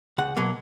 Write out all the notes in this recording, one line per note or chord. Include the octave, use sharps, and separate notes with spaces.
C#2 F#5
B2 F#3 A#3